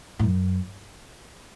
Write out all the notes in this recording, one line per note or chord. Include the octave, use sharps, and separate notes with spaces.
A2
F#2